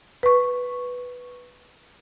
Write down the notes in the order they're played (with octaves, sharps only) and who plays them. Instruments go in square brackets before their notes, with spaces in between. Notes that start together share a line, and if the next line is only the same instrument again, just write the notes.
[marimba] B4 C#6